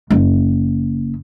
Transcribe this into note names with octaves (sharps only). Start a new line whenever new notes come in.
F#1